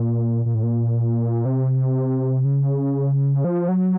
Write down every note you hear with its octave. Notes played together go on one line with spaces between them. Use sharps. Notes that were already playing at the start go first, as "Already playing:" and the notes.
Already playing: A#2
A#2
A2
A#2
C3
C#3
F3
F#3